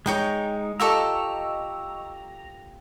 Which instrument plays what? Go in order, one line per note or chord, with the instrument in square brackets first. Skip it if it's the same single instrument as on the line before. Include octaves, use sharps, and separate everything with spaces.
[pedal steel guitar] G#3 D#4 [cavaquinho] C#5 G5 A#5
[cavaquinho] F4 G4 A4 [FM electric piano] D#5 C#6 E6 [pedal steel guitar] A#5